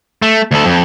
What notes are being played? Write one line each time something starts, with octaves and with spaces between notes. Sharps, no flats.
A3
D2 A4
F2